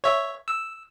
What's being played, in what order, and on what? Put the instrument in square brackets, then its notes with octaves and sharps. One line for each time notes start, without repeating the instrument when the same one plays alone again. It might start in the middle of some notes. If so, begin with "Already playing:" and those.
[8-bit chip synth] C#5 E5
E6